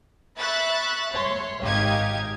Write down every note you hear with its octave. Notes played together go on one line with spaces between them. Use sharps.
E5 B5 C#6 F#6 A6
C#5 C6
G#1 D#4 G4 F5 G#6